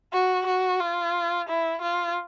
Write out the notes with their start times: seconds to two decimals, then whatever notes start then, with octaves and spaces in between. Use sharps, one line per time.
0.13 F#4
0.46 F#4
0.80 F4
1.49 E4
1.81 F4